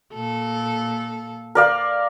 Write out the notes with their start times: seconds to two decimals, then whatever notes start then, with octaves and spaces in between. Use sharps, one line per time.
0.14 A#2 A4
1.55 A#4 D5 F5